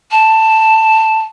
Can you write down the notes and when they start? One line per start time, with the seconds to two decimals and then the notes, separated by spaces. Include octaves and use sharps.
0.11 A5